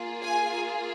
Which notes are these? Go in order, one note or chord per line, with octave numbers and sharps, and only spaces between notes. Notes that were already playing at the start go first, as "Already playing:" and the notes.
Already playing: A#3 F4 G#4
G#5